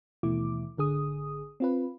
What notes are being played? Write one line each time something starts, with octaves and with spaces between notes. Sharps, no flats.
D#2 B2 E3 A3 E4 D6
G#1 D3 G#4 D#6
C4 F4 B4